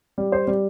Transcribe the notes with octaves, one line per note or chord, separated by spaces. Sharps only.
G3
C5
G3